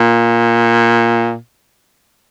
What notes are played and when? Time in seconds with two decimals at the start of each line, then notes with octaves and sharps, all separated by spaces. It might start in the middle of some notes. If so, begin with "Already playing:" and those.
Already playing: A#2